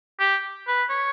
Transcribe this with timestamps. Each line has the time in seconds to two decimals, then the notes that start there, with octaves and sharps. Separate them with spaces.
0.19 G4
0.67 B4
0.90 C#5